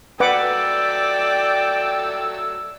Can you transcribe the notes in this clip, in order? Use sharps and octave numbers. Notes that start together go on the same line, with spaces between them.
F#3 A3 B4 D5 F#5 G5 D6 E6